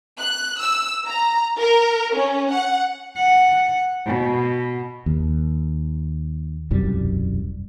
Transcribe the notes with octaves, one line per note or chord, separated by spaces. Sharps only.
F#6
E6
A#5
A#4
C#4
F#5
F#5
B2
D#2
E1 C2 F#2 G3